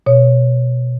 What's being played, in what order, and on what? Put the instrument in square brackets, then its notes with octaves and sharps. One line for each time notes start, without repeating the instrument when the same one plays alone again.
[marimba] B2 C#5